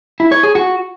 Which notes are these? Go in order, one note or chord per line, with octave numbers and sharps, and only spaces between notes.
E4
C#5
G#4
F#4